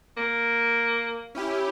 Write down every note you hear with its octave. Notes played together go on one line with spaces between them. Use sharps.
A#3
C#4 E4 G4